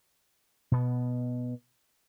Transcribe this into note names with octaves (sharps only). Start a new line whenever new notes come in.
B2 B3